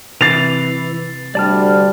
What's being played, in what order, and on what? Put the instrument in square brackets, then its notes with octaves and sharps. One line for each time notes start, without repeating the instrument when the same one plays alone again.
[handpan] C3 [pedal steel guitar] E3 [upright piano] A6 C7 F7
[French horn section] D2 G3 [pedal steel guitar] D5 A5 F6